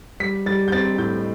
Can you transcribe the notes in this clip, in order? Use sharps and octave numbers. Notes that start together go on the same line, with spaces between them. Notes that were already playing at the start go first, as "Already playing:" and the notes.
G3 B6
G3 A6
G6
C4 A6
A2 G6